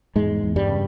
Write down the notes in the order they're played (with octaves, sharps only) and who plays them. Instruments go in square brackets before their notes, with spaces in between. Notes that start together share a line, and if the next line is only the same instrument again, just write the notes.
[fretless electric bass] E2 G#2 G#3
E2
G2 G3
C#3